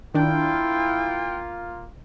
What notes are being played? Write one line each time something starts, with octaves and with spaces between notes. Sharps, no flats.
D#3 A#3 D4 E4 F4 G5